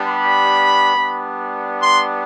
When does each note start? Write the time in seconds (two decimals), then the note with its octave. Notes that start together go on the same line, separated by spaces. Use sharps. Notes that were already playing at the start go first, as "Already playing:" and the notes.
Already playing: G3 B3 D4 G4
0.09 B5
0.94 G3 B3 D4
1.82 C6